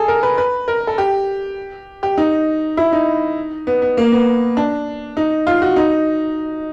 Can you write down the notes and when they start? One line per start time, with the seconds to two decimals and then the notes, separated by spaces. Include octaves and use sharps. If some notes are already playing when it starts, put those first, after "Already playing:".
Already playing: G#4 A4
0.08 A#4
0.23 B4
0.38 B4
0.68 A#4
0.87 A4
0.98 G4
2.03 G4
2.17 D#4
2.77 E4
2.92 D#4
3.67 B3
3.82 B3
3.97 A#3
4.12 B3
4.57 D4
5.17 D#4
5.47 F4
5.62 F#4
5.76 D#4